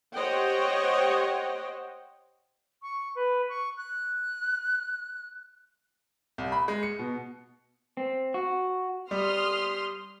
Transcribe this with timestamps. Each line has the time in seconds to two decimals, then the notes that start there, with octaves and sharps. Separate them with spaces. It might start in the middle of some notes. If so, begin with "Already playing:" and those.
0.15 G4 C5 C#5 D#5 F#5 G5
2.82 C#6
3.15 B4
3.48 C#6
3.77 F#6
6.38 C2
6.52 B5
6.68 G#3
6.83 C#7
6.99 B2
7.97 C4
8.34 F#4
9.11 G3 C6 D#6 F6